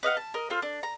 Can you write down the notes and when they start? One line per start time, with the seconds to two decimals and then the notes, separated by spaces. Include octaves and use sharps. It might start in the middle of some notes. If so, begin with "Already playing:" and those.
0.03 B4 D#5 F5 F#5
0.17 A5
0.34 A#4 D#5
0.50 F4 A4 C5
0.62 D4
0.83 A#5